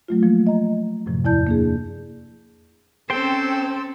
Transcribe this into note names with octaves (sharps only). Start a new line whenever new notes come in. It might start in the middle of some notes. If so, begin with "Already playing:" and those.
F#3 A3 F4
F3 A#3
D#5 A#5
F#2 A2 C3 F3
E2 F3 E4 D5 A5 G6
A#3 D4 G#4
C4 C#4 A4 C5 G5